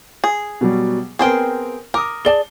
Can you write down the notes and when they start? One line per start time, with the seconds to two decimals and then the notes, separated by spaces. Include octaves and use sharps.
0.24 G#4
0.61 B2 F#3 G3
1.19 B3 C4 G#4 A#4 C5 G5
1.94 A#4 D6 D#6
2.25 G#4 D5 A5 G7